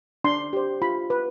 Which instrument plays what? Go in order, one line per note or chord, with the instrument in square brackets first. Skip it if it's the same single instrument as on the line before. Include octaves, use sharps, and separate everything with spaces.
[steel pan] D4 C6
G4 C5
F4 B5
B4